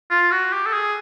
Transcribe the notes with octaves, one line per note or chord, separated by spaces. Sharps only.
F4
F#4
G4
A4
G#4